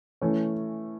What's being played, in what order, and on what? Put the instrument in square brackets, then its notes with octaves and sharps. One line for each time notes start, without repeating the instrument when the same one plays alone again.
[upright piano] E3 A3 C#4